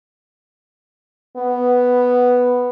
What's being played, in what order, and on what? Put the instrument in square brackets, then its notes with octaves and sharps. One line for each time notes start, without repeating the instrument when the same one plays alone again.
[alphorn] B3